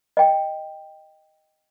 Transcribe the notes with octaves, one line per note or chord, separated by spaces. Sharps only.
D#5 G5